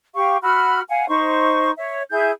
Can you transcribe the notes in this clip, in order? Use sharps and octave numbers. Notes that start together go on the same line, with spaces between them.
G4 F5 C#6
F#4 B5 E6 F6
F5 F#5 G#5
D#4 C5 C#6
C#5 E5
E4 G#4 E5 G6